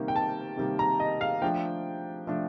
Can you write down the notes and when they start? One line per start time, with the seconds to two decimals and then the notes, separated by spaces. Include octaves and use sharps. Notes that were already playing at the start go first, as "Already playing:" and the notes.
Already playing: C3 D#3 G3 A#3
0.08 G5
0.16 A5
0.57 C3 D#3 G3 A#3
0.79 A#5
1.00 D#5
1.21 F5
1.42 F3 A3 D4 G5
2.27 F3 A3 D4